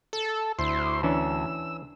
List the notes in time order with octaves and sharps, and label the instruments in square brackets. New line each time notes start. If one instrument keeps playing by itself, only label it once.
[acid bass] A4
[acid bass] D2 [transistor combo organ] E4 C5 C6
[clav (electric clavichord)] E3 C#4 D4 [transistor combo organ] E6